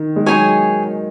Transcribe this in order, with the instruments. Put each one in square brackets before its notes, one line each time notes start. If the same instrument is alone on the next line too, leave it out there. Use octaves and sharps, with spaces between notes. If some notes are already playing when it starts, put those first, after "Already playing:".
Already playing: [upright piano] D#3
G#3
[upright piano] F#3 [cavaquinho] D#4 G#4 C#5 G#5